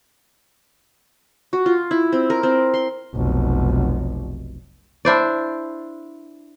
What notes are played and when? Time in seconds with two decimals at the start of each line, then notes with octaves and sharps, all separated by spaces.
1.53 F#4
1.66 F4
1.91 E4
2.12 C4
2.30 A#4
2.43 C4
2.74 C6
3.15 F1 B1
5.05 D4 E4 C5 D5